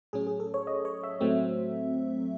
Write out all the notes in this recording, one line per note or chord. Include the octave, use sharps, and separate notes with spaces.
A2 F#3 C#4 G#4
G#4
A4
C#5
D#5
C#5
E5
A2 F#3 A3 C4